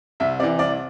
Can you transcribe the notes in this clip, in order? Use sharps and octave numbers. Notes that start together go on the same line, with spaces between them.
C2 E5
C3 E3 D5
C2 D5